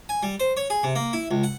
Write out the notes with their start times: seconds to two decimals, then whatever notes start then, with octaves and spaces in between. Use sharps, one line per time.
0.09 G#5
0.23 G3
0.40 C5
0.57 C#5
0.70 G#4
0.83 C3
0.95 A#3
1.13 E4
1.31 C#2
1.43 F#5